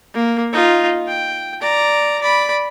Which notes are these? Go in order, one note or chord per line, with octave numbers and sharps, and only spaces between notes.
A#3
D#4 F4
G5
D5 A#5
D5 B5